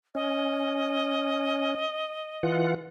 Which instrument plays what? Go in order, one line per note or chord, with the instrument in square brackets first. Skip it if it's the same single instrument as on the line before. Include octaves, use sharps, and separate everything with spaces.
[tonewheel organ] C#4 [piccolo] D#5
[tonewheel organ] E3 F4 F#5